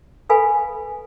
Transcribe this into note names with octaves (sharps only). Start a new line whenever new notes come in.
A4 B4 F5 G#5 B5